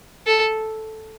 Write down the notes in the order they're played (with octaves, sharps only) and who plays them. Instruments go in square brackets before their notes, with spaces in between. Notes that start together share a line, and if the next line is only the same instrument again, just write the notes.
[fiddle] A4